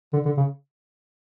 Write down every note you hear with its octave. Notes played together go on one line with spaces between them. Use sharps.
D3
D3
C#3